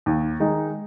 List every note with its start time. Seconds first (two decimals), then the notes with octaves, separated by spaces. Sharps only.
0.06 D#2
0.40 D#3 G#3 D#4